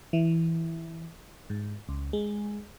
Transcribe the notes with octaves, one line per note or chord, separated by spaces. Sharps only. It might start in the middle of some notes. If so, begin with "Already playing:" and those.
E3
G#2
C#2
G#3